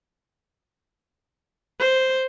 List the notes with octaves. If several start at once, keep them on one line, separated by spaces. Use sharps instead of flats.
C5